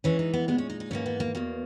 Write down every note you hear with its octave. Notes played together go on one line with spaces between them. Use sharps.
G#2 E3 G#3 C#4
D#4
B3
A#2 G#3 B3
C#4
D#4
D#4
G#2 E3 A#3 C#4
B3
A#3
E2 B2 A#3